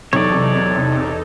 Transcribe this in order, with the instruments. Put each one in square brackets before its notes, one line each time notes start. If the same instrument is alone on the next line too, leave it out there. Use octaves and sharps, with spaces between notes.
[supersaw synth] E2 D#4 A4 [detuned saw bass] C3 [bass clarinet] F#3 [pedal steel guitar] C#5 D5